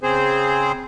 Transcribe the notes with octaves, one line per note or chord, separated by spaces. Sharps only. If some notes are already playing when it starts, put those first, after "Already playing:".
C#3 C4 G#4 C5